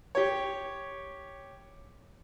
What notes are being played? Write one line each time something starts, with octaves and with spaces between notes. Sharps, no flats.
G4 C#5